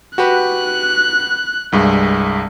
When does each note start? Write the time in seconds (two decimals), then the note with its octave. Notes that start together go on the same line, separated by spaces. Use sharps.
0.18 F#4 G4 B4 F#6
1.72 C2 G2 G#3